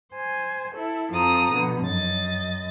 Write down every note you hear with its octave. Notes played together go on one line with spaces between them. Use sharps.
C5 G#5
E4 A4
F2 F3 A4 A#5 D#6
B2 D3 F3
F#2 D#5 A6